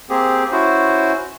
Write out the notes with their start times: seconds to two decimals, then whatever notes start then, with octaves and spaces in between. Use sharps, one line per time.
0.10 A#3 C4 G4 G#4
0.52 C#4 E4 F#4 C5